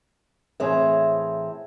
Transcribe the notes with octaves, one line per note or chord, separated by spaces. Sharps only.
A2 E3 C4 G#4 C#5 E5